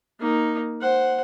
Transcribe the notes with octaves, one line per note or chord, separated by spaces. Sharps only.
A#3 D#4
C5 F#5